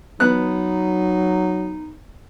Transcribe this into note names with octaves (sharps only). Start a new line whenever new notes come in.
F#3 B3 D#4 F#6